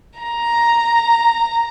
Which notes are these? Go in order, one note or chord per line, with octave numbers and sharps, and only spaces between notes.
A#5